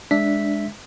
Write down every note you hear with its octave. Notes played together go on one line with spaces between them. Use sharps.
G#3 D4 E5 B6